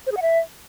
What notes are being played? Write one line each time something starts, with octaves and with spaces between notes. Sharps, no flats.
C5
G#4
F#5
E5